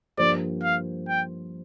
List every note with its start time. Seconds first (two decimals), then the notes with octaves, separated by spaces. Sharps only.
0.18 G2 F3 A#3 G4 C5 D5
0.63 F5
1.08 G5